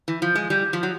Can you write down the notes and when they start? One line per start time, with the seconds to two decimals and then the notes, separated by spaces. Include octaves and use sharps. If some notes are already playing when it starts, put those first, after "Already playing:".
0.08 E3
0.22 F3
0.35 G#3
0.50 G3
0.73 F3
0.83 F#3